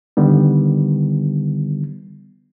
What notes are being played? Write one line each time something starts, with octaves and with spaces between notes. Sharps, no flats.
D3 D#3 G3 B3